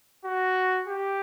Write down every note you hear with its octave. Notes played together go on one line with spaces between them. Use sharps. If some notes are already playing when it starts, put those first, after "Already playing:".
F#4
G4